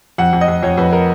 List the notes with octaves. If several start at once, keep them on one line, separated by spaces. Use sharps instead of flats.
F2 F#5
F2
D#5
F2
F2 C#5
F2 B4
A#4